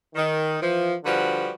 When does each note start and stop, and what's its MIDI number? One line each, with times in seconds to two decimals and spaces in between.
0.15 0.56 51
0.60 0.93 52
0.60 0.93 53
1.04 1.50 50
1.04 1.50 53
1.04 1.50 55
1.04 1.50 66
1.04 1.50 71